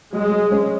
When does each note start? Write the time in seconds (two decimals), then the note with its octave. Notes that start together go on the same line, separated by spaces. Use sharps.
0.12 F#3 G#3
0.32 G#4
0.52 C#4